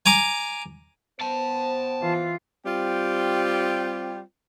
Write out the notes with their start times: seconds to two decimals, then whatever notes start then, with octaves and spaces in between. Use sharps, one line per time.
0.06 G#5 A#5 D6
1.21 B3 C5 G5 A5
2.01 E3 F4
2.65 G3 C4 F4 G4 G5